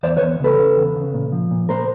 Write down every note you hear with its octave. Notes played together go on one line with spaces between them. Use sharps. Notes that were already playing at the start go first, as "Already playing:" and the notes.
E2 C5 D5
B4 C#5
E2
C#3 A4 B4
C#3
E2
C#3
A#2
F3
A#2
A#2 A#4 C5